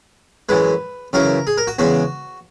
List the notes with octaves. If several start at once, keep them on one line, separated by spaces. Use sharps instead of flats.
F#2 E3 G#3 B4
F#2 C#3 E3 A#4
G#4
A#4
F#4
E2 C#3 G#3 F#4